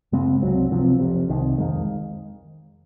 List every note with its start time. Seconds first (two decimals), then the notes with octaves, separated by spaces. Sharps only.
0.12 F#2 C#3 G#3 C4
0.41 C2 C3 F#3 C4
0.71 C#2 C3 F3 C4
1.00 F1 F2 C3
1.29 C2 C3 D#3
1.58 F2 D#3 G#3